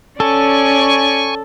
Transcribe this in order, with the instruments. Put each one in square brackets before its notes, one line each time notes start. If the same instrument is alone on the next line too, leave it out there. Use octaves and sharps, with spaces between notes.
[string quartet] C#4 D5 [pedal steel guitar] A4 [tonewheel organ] G#5 C#6